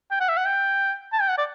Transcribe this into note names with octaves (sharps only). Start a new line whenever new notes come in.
G5
F#5
E5
F#5
G5
A5
G5
F#5
D5